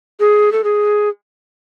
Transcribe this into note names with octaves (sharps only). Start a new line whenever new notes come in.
G#4
A4
G#4